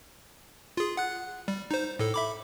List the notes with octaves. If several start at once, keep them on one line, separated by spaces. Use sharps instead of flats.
F4 G#4
F#5 F#6
G3
D#4 C5
A2 A4
E5 B5 D6